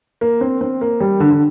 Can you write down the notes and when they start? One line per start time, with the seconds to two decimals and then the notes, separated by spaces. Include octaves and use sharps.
0.21 A#3
0.41 C4
0.61 C4
0.81 A#3
1.00 G3
1.20 D3
1.30 D3